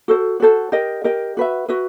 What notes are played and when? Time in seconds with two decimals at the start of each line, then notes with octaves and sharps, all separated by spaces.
0.08 F#4 A4 C5
0.40 F#4 A4 C5
0.72 G4 A#4 D#5
1.04 G4 A#4 D#5
1.37 F#4 B4 E5
1.68 F#4 B4 E5